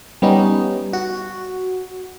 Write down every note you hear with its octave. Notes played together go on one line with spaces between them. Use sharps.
G3 B3 C#4 D#4
F#4